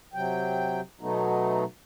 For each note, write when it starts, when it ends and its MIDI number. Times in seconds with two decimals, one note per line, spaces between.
0.14 0.81 48
0.14 0.81 54
0.14 0.81 79
1.01 1.64 47
1.01 1.64 54
1.01 1.64 57
1.01 1.64 59
1.01 1.64 63